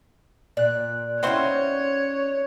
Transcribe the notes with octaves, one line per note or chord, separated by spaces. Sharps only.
A#2 D5 F#6
C4 C#4 D#4 E4 F#4 C5 C#5